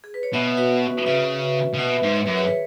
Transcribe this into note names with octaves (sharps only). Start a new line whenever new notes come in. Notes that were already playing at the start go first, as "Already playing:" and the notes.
G#4
B4
C#5
B2 B4 E5
F#4 B4
C#4
C#3 B4 E5
C#3
B2 B4 E5
G#2
C#5
F#2 B4
G#4 C#5
B4